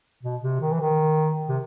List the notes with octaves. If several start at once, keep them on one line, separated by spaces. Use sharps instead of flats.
B2
C3
D#3
E3
D#3
C3